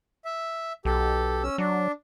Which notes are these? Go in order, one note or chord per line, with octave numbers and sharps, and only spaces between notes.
E5
B1 G4 A4
C#4 E6
F#3 D4